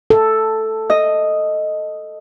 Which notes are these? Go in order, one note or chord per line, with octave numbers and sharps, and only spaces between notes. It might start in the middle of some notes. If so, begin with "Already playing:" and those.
A4
D#5